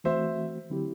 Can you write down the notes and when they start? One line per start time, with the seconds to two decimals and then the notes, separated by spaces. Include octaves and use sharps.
0.04 E3 A3 C4 F#4 C5 E5
0.70 D3 F#3 C4 E4 G4